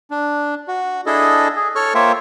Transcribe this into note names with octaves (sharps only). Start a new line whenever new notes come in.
D4
F#4
D4 E4 G#4 A4 D#5
G#4
A4 C#5 C#6 F6
A#3 F4 C5 C#5 E5 G5